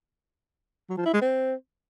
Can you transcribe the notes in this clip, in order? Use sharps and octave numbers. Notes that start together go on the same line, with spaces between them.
F#3
F3
E4
G#3
C4